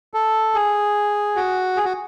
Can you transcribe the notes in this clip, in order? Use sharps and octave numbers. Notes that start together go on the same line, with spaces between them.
A4
G#4
F#4
G#4
F#4